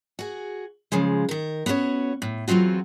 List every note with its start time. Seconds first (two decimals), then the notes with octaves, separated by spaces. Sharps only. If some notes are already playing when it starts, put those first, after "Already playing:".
0.19 F#4 G#4
0.92 C#3 F3 G#3
1.29 D#3 A#4
1.66 B3 C#4 F#4 B4 C#5
2.22 A2
2.48 E2 F#3 C4 F4 F#4